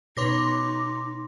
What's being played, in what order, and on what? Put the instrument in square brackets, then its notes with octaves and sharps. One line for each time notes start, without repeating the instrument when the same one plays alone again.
[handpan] B2 B4 C#5 [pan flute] D#4 [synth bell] C6 D6 A#6